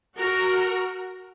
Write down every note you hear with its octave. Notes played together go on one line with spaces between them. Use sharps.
F#4 A#4